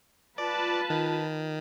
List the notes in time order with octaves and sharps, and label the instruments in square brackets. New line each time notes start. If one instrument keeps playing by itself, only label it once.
[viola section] F4 B4 A5 [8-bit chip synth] D5
[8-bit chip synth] D#3